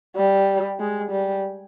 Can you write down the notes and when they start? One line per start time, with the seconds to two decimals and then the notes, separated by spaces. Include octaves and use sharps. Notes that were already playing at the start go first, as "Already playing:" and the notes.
0.17 G3
0.79 G#3
1.11 G3